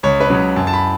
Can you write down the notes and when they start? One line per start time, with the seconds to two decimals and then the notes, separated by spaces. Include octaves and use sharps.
0.03 C#2 C#5
0.20 B4
0.30 C#3 F#3
0.56 F#2 A5
0.67 A5
0.73 B5